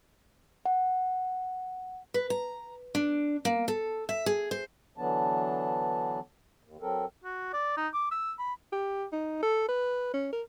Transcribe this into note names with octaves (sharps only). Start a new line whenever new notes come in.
F#5
B4
A#5
D4
A#3
A4
E5
G#4
C5
D3 E3 F#3 B3 D4 A5
D#2
F#3 C4 A4 A#4
F#4
D5
D#4
D6
E6
B5
G4
D#4
A4
B4
C#4
A#4